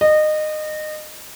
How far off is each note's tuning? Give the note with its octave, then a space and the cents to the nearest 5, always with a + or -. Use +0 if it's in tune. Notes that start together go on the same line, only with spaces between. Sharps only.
D#5 -25